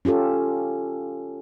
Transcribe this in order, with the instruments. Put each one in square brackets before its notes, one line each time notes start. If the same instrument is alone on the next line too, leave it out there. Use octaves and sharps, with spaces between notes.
[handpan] C#4 F4 G4 A4